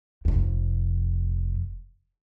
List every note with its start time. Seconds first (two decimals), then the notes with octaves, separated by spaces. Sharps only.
0.25 F1 F2